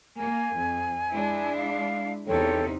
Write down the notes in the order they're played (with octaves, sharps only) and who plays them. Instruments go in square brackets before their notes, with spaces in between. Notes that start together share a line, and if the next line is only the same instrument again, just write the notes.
[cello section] A#3 [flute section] G#5
[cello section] F2
G#3 D4 E4
[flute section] F5
[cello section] E2 C3 D#4 [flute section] A4 C#5 G5